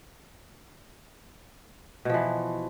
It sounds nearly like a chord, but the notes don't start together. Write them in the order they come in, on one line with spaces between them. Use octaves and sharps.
B2 F3 E3